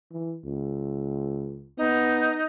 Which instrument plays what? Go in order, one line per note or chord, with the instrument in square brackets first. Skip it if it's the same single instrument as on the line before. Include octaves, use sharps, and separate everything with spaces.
[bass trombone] E3
C#2
[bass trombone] B3 [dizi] D#4